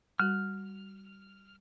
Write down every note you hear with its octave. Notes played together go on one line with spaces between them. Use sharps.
G3 F#4 F6